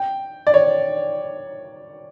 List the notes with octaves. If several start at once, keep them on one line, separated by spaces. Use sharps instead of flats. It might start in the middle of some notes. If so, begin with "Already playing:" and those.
Already playing: G5
D5
C#5